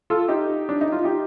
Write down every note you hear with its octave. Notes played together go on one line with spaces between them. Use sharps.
F4 A4
D#4 G4
D4
D#4
F4
D#4 G4